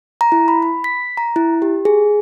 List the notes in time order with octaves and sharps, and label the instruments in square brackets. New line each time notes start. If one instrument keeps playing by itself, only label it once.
[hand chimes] A#5
E4
B5
B5
B6
A#5
E4
G4
G#4